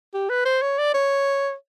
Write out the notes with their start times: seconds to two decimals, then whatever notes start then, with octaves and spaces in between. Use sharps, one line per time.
0.14 G4
0.29 B4
0.45 C5
0.62 C#5
0.78 D5
0.94 C#5